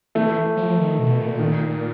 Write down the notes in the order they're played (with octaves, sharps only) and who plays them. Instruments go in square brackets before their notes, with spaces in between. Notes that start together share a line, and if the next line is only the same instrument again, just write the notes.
[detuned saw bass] E3 [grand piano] A3
[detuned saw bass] F3
D#3
B2
A#2
[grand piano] D#3